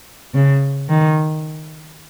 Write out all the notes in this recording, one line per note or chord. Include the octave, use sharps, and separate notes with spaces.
C#3
D#3